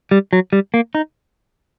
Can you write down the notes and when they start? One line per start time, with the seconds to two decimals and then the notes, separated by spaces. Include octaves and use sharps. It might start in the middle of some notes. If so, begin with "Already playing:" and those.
0.11 G3
0.33 F#3
0.53 G3
0.74 A#3
0.95 D#4